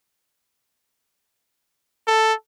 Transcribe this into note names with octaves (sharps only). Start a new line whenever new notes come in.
A4